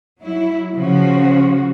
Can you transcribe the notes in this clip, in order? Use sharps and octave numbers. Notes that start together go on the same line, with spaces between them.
F#3 E4
C#3 F3 F#4